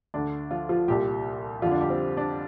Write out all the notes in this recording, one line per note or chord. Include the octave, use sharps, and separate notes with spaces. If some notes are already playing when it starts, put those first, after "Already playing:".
D2 D3 D4
F3 F4
F3 F4
C2 A#2 G3 G4
F2 D3 F3 F4
D4
G3 G4
C4
D4